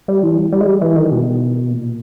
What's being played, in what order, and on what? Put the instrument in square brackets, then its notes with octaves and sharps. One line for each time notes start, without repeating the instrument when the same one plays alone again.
[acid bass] G3
E3
G3
G3
G#3
G3
E3
D#3
B2
A#2